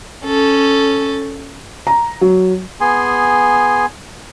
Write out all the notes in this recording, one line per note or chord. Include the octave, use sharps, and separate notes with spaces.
C#4 A4
A#5
F#3
B3 G#4 G#5 C6